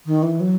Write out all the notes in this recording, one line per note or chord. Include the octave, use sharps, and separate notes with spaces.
D#3
E3
F#3